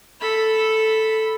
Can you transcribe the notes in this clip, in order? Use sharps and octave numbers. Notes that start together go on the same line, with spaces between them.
A4 B5